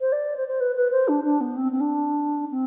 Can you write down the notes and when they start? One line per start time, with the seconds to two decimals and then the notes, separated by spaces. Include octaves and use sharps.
0.01 C5
0.12 D5
0.37 C5
0.48 C5
0.60 B4
0.76 B4
0.92 C5
1.08 D4
1.24 D4
1.41 B3
1.57 C4
1.72 C4
1.80 D4
2.51 C4